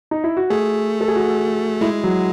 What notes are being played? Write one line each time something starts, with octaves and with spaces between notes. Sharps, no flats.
D#4
E4
F#4
A3 G#4
A4
G#4
F#4
G#3 E4
F#3